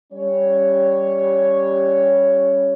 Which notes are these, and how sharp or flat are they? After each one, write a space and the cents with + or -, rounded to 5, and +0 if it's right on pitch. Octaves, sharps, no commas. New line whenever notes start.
G3 +0 C#4 +0 C#5 +0